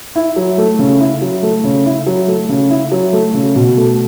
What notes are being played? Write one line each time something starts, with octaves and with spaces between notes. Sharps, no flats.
E4
F#3
A3
C#3
E4
F#3
A3
C#3
E4
F#3
A3
C#3
E4
F#3
A3
C#3
B2
A3